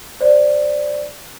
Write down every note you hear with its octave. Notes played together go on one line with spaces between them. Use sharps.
C5 D5